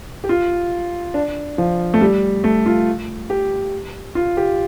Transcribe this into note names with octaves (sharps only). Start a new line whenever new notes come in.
G4
F4
D4
F3
A3
G3
A3
F4
G4
F4
G4